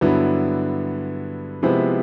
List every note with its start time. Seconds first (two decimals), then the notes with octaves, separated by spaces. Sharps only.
0.01 G2 D3 F#3 B3 E4
1.62 C3 F3 G#3 B3 E4